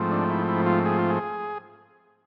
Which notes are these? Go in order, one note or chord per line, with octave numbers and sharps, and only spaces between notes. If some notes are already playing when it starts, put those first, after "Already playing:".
Already playing: G#2 F3 A3 C4
D4
E4
E4
F4
G#4
F4
G#4